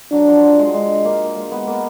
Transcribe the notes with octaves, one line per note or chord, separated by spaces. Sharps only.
F#3 D4
F3
F#3
G#3
G#3
A#3
G#3
B3
A#3